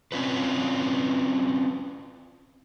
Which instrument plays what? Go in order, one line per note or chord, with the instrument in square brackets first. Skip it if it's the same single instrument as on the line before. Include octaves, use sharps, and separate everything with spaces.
[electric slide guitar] C4 C#4 F4 B4